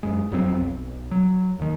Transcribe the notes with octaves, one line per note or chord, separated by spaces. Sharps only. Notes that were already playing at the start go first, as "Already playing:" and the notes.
F#2 G#3
G1 F2 F#3 C4
B1
F#3
D#2 D#3